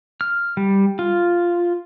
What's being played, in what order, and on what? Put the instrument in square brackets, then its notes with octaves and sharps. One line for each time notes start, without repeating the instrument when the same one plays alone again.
[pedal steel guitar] F6
G3
F4